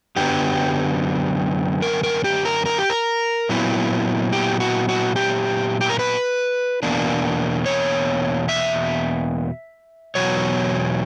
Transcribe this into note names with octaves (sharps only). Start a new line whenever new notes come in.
F#2 D3 F#3 B3 G4
A#4
A#4
G4
A#4
A#4
G4
A#4
A#2 F#3 B3 E4
G4
F#4
F#4
G4
G4
A#4
B4
E2 B2 A#3 D4
C#5
E5
E2 B2 F#3 C#5